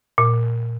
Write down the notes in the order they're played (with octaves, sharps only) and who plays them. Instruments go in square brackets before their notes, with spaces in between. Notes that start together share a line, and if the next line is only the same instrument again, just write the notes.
[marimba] A#2